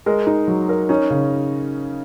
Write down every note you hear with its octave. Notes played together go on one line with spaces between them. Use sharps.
G#3 A#4
D#4
F#3
A#4
C#4 D#4
C#3